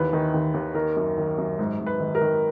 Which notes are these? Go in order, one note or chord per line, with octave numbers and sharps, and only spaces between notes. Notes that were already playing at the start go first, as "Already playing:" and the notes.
Already playing: D#2 E3 B4
D#3
D#2
D#2
D#3 A#4
F#2
D#3
F#2
G#2
G#2
B4
D#3
A#4
D#3